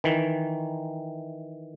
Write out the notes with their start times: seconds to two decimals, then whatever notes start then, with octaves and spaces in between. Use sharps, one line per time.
0.04 D#3 E3